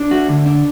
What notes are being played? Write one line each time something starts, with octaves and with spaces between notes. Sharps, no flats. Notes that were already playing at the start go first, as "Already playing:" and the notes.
Already playing: D4
A3 F#4
D3
D4